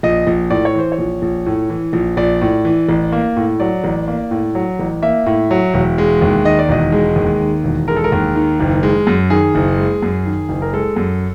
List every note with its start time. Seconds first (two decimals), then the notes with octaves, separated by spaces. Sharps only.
0.03 A#1 D#5
0.27 A#1
0.50 A2 D5
0.65 C#5
0.75 E3 C5
0.92 C#5
0.99 A#1
1.22 A#1
1.46 A2
1.70 E3
1.93 A#1
2.17 A#1 D5
2.41 A2
2.65 E3
2.89 A1
3.12 A#3
3.37 A2
3.60 F#3 D5
3.84 A1
4.08 A#3
4.31 A2
4.55 F#3
4.79 A1
5.02 A#3 E5
5.26 A2
5.51 F#3
5.74 E1
5.98 G#3
6.22 D#2
6.45 D#3 D#5
6.59 D5
6.69 E1 D#5
6.92 G#3
7.16 D#2
7.40 D#3
7.64 E1
7.88 G#3 A#4
7.96 A4
8.04 A#4
8.12 D#2
8.36 D#3
8.60 F#1
8.83 G#3
9.07 F#2
9.30 D#3 G#4
9.55 F#1
9.77 G#3
10.02 F#2
10.26 D#3
10.49 F#1
10.62 A#4
10.73 G#3 A4
10.96 F#2